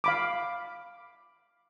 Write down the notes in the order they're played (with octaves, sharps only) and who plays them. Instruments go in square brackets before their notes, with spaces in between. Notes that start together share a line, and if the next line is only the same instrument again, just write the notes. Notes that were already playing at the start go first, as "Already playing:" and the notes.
[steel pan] F5 B5 D6